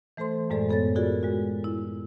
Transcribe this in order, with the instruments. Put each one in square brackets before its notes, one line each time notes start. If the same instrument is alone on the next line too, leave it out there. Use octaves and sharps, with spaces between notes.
[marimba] E3 A3 A4 C5 C6
F#2 A2 G#3 G#4 A4 D5
F#2 B3 A4 C#5 A6
F4 F#4 G#4 A#4 D5
G#3 F#4
E4